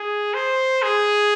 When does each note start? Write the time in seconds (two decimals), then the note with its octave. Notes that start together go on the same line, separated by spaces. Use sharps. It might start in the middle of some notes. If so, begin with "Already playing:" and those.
Already playing: G#4
0.34 C5
0.83 G#4